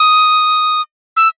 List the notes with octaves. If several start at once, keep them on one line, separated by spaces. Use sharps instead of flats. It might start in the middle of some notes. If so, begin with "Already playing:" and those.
Already playing: D#6
E6